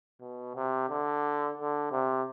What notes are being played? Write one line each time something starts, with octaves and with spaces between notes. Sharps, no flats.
B2
C3
D3
D3
C3